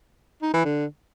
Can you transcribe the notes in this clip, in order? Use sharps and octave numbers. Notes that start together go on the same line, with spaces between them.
D#4
E3
D3